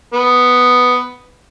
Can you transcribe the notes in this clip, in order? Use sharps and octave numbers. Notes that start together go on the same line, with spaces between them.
B3